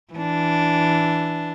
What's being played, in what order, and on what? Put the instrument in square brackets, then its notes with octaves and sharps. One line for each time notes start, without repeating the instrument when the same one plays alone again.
[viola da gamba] E3 D4